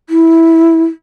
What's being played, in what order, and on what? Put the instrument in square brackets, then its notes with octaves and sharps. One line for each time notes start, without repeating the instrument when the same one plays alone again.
[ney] E4